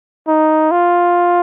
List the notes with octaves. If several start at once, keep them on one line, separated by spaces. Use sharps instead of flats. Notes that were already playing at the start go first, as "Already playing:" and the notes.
D#4
F4